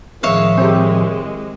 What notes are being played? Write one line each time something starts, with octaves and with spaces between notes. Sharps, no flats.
A2 D#3 F3 G#3 C#5 E5 F5
C4 G4